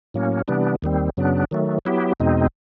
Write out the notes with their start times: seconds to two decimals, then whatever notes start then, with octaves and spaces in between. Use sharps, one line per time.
0.14 A2 F#3 A#3 C#4
0.48 C3 E3 G3 B3 D4
0.82 D#2 D#3 G3 C4
1.17 F#2 C#3 F#3 B3 D4
1.51 D#3 F#3 A3
1.85 F#3 B3 E4 G4
2.20 E2 B2 G#3 C4 D#4